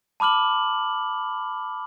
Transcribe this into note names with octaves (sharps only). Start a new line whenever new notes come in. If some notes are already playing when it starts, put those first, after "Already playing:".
A5 B5 D6 F6 F#7